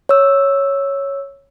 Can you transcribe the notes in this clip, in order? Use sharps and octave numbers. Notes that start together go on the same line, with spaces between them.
C#5 E6